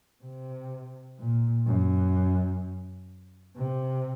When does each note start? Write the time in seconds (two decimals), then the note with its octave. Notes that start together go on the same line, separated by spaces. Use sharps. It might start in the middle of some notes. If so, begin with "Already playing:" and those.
0.23 C3
1.19 A#2
1.67 F#2
3.56 C3